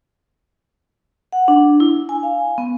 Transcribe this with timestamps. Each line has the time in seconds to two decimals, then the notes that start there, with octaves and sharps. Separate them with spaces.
1.32 F#5
1.48 D4
1.80 E4
2.09 G#5
2.23 F5
2.58 B3